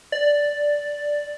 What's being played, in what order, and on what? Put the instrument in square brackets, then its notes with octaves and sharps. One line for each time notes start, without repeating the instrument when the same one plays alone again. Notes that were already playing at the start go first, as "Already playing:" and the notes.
[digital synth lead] D5